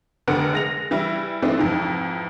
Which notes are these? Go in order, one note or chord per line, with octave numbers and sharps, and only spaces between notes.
F1 D3 B3 A#4 F#5 D7
G#3 A#6 F7
E3 G3 E4
E3 A3 B3 C4 D4 D#4
F2 G#2 E3